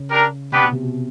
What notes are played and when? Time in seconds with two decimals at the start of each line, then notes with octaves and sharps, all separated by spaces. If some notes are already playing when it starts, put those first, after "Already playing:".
Already playing: C#3
0.10 D4 G4 A#4
0.51 C3 B3 D4 G4 B4
0.63 B2
0.72 C3
0.83 B2